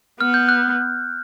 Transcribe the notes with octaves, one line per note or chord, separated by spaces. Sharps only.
B3 F6
G6
F#6